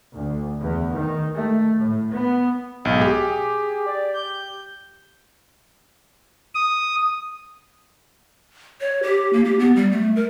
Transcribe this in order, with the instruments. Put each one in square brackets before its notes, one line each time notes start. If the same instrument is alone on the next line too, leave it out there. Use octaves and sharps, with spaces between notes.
[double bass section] D2
E2
D#3
A3
A2
B3
[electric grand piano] B1 [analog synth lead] G#2
[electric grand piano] G4 [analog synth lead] G#4
[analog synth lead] D5
G6
[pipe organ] D#6
[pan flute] C#5
G4
A#3
G4
B3
G3
A3
A#4